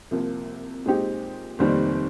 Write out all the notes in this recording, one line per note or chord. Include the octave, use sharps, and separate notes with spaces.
C2 C3 F3 A#3
A#2 G#3 C4 D#4 G4
F1 D#2 D#3 G3 C4